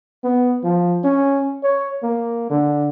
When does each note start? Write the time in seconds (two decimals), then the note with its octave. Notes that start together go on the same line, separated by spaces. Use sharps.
0.24 B3
0.64 F3
1.04 C#4
1.63 C#5
2.03 A#3
2.50 D3